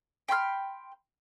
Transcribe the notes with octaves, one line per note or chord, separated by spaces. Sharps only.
G5 B5 C6 F6